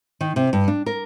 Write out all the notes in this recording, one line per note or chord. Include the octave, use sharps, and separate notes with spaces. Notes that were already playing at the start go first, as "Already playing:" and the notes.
D#3
C3
G2
D4
A#4